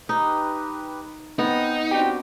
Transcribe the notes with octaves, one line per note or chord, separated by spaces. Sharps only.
D#4 G4 B4
B3 C4 D#4
C4 D4 F#4 G4